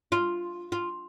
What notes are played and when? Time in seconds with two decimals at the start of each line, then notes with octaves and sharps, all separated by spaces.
0.12 F4
0.72 F4